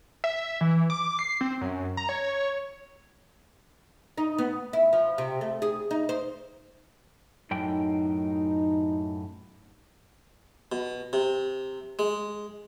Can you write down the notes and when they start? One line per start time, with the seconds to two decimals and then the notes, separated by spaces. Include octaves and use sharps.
0.24 E5
0.61 E3
0.90 D6
1.19 C7
1.41 C4
1.61 F#2
1.97 A#5
2.09 C#5
4.18 D#4
4.38 B3
4.73 E4
4.93 F3
5.18 C3
5.41 A3
5.62 G#4
5.91 D#4
6.09 C5
7.51 F#2 A2 D#4 G5
10.72 B2
11.13 C3
11.99 G#3